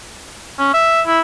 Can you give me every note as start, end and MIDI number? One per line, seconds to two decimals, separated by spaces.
0.59 0.70 61
0.74 1.01 76
1.07 1.20 64